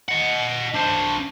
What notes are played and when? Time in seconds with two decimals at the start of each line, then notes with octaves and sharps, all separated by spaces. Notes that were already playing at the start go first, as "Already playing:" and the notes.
0.09 D#5 F#5
0.75 D4 C5